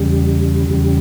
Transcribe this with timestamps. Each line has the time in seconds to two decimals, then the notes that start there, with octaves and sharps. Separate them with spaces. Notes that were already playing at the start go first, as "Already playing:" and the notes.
Already playing: E2 C#3 G3
0.69 E2 C#3 G3